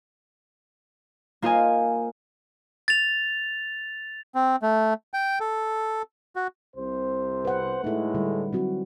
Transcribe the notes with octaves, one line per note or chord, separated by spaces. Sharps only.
A#3 F4 C5 D#5 G#5
A6 F7
C4
A3
G5
A4
F#4
C2 C3 C5
B4 F#5
A2 G#3 A3 D#4 E4
D3 G3
F#3 C4 F#4